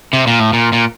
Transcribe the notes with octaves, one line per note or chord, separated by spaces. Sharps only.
C3
A#2
A2
A#2
A#2